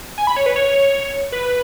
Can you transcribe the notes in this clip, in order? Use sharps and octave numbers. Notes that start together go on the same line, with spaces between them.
G#5
B5
C#5
B4
C#5
B4